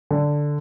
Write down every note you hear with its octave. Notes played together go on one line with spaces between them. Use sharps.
D3